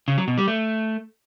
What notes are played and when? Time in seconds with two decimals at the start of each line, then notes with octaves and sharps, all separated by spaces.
0.08 C#3
0.18 F#3
0.28 B2
0.38 G3
0.48 A3